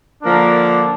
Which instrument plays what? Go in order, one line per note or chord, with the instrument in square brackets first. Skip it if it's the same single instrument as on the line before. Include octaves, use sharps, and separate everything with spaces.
[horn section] D3 F3 A#3 D4 A#4